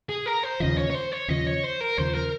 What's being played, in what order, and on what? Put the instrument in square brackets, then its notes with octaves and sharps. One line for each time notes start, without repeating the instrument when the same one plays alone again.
[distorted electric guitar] G#4
A#4
C5
[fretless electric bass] D#2 C#3 F3 [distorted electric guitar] D#5
[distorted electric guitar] C#5
C#5
C5
C#5
[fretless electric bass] D#2 C#3 F3 [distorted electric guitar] D#5
[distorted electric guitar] C#5
C5
A#4
[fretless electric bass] D#2 C#3 F3 [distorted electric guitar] C5
[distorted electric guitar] A#4